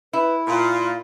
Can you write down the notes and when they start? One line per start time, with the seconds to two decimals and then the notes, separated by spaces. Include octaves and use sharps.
0.13 E4 B4
0.47 A#2 F4